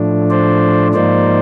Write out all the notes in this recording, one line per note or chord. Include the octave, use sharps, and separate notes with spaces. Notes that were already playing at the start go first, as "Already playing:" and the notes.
Already playing: A2 F3 A3 D4
C5 D5
G#2 F3 A#3 D#4 C5 D5